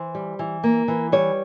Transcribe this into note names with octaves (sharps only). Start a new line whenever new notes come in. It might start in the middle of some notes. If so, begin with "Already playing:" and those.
Already playing: E3 C5
G3
E3
A#3
E3
G3 C#5